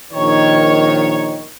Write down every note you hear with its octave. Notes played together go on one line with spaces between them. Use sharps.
A#1 D#3 C#5